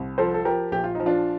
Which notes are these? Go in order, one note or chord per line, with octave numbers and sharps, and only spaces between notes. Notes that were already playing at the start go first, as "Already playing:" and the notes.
Already playing: C2
F3 A4 C5
A4
F3 G4 A#4
A#1 G4
F4
F3 D#4
D4 F4